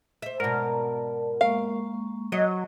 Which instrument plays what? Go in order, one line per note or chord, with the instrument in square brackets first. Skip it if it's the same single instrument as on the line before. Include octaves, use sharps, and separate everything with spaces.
[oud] C5 E5
[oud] G#2 B2 [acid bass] A#4 [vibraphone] D5 A5
[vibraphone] G#3 A#3 C#6 [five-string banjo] F5
[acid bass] F#3 [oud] D#5